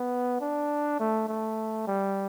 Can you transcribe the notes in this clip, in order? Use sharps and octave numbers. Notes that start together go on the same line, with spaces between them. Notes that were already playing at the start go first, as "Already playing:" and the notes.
Already playing: B3
D4
A3
A3
G3